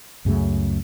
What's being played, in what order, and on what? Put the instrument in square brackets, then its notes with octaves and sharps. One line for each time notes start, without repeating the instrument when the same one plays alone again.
[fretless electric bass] C#2 F#2 C#3 A3